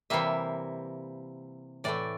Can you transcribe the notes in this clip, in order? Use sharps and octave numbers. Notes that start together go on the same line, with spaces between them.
C3 E3 G3 A#3 E5
A2 E3 A3 D5